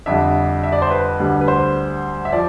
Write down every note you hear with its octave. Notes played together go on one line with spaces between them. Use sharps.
F2 D3 G3 E5
E5
D5
C5
B4
D2 D3 G3
B4
C5
E5
F3 D5